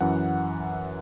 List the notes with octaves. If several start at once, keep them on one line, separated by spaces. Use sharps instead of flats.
F#2 E3 F#5